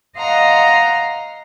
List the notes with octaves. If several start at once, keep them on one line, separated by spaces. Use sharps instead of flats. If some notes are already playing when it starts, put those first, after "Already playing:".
D#5 F5 F#5 A#5 C6